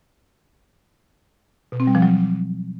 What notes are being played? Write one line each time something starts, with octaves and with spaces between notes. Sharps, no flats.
B2
C4
G3
F3
F#3